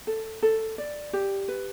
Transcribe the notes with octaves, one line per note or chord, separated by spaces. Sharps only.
A4
A4
D5
G4
B4